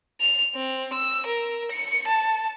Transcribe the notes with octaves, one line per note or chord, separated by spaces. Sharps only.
F7
C4
E6
A#4
C#7
A5